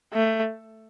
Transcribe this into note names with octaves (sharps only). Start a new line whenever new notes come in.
A3